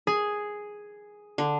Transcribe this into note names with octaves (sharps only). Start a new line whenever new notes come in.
G#4
D3